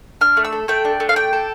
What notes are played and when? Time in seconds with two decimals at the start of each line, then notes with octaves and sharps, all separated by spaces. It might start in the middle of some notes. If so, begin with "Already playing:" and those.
0.21 D4 F6
0.37 A3
0.44 E6
0.52 A4
0.68 A3 G5
0.85 D4
1.00 A3
1.09 F5
1.16 D4 G5
1.33 A4